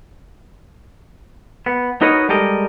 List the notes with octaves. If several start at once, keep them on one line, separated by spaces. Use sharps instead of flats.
B3
D#4 F#4 A#4 B4 C#5 D#5
G3 G#3 G4 A4 A#4 D#5